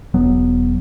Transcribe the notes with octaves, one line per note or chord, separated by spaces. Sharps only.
E1 F#3 B3